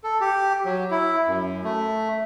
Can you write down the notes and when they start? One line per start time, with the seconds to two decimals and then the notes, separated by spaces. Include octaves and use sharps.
0.04 A4
0.21 G4
0.65 F#3
0.91 E4
1.28 F#2
1.64 A3